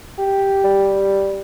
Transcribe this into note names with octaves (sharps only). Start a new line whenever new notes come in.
G4
G3